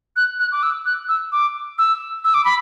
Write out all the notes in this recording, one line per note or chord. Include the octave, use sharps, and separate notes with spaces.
F#6
F#6
D6
E6
F#6
E6
D6
E6
E6
D6
B5